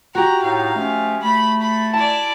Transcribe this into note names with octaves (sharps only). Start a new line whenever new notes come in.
F#4 G4 A#5
A2 D#4 F5
F3 A3 C#4
A3 B5
B5
E4 D5 A5